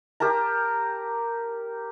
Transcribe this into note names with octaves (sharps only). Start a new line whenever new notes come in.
G4 A#4 A5 A#5